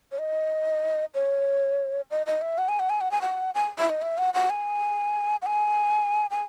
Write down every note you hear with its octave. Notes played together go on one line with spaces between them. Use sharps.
C#5
D#5
C#5
D#5
D#5
E5
F#5
G#5
F#5
G#5
F#5
G#5
F#5
G#5
E5
D#5
E5
F#5
F#5
G#5
F#5
G#5
G#5